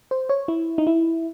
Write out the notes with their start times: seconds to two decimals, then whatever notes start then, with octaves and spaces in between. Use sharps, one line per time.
0.11 C5
0.29 C#5
0.48 E4
0.78 D#4
0.87 E4